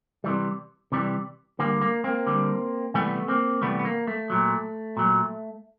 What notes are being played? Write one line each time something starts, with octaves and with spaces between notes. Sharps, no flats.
C3 E3 G3
C3 E3 G3
D3 G3 A#3
A#3
A#3 C4
D3 G3
C3 E3 G3 A3 B3
A#3 C4
C3 E3 G3 A3 B3
B3
A#3
A3
A#2 F#3
A#2 F#3